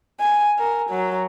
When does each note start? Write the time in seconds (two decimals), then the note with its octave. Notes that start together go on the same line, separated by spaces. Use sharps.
0.20 G#5
0.59 A#4
0.90 F#3